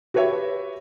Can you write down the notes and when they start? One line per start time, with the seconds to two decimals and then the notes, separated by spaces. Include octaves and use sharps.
0.14 F#4 G4 B4 C#5 E5